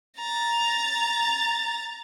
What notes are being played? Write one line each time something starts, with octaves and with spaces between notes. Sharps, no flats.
A#5 A6